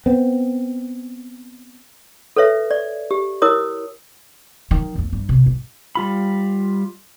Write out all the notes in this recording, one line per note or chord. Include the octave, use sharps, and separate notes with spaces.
B3 C4
A4 B4 C#5 E5
D5
G4
E4 A#4 C#5 D#6
D#3 F#3
F2 A3
G2
C3
G2
G3 F4 B5